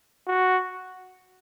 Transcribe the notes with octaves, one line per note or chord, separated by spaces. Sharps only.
F#4